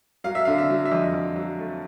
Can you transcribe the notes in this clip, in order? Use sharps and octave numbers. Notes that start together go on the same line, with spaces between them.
F#3 F5
E5
D3 F5
E5
F#3
E5
F2 D#5
F2
F#3
A3